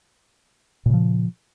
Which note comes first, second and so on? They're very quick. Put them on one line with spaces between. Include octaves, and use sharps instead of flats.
A#2 C#3 F3